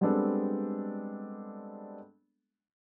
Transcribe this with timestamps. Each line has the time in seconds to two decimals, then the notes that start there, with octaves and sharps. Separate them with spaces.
0.01 G3 G#3 B3 C4 D4 A4